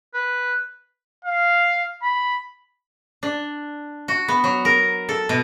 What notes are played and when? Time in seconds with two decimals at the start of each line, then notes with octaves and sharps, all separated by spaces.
0.14 B4
1.25 F5
2.03 B5
3.23 D4
4.08 F#4
4.28 B3
4.44 F#3
4.65 A#4
5.09 A4
5.29 B2